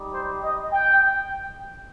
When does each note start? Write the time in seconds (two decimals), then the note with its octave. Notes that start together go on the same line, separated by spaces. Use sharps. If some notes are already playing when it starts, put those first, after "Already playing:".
Already playing: G3 D#4 G4
0.11 C5
0.42 D#5
0.73 G5